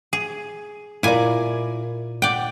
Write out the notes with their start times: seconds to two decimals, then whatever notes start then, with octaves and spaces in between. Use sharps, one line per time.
0.13 G#4
1.03 A#2 E4 A#4 D5 G#5
2.22 D5 F#5 G5